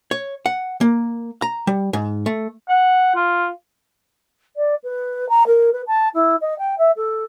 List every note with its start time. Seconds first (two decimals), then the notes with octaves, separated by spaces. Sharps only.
0.11 C#5
0.46 F#5
0.81 A#3
1.42 A#5
1.67 G3
1.93 G#2
2.26 A3
2.69 F#5
3.15 F4
4.56 D5
4.84 B4
5.29 A#5
5.47 A#4
5.73 B4
5.87 A5
6.14 E4
6.41 D#5
6.58 G5
6.78 E5
6.97 A4